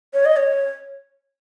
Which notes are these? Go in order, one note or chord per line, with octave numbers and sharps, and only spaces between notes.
C#5
D#5
C#5